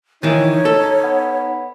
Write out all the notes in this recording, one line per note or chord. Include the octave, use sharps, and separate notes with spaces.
D#3 E3 D#4 C#5
A4
B3